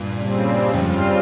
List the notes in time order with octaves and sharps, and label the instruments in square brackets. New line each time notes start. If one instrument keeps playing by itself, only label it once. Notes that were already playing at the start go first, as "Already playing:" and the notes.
Already playing: [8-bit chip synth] G2 A#2
[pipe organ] C#3 G3 C4
[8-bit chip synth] F2 G#2 [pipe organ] C#3 G3 C4 F4
[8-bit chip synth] G2